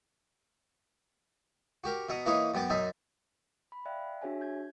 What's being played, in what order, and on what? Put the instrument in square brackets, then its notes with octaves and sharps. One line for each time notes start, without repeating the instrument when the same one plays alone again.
[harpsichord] F#4 G4 A#4
B2 E5 F#5 A#5 D#6
E3 A#3 D#4 B4 C#5 D#5
F#2 B3 G5 A5 D6
F#2 D#4 E5 G#5
[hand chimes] B5
D5 E5 F5 G5 F#6
D4 F#4 G#4 C#5 E5 G#5
G6 G#6